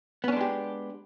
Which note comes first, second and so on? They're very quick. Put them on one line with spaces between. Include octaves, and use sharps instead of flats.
B3 C#4 D4 G#3 G4